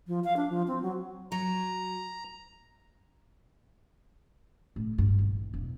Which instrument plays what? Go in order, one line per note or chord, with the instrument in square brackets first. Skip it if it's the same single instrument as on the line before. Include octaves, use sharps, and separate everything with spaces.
[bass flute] F3
F5
D4
F3
C4
F#3
[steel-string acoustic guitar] F#3 [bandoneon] A#5
[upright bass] A2 C3
G2
D#1 A1
E1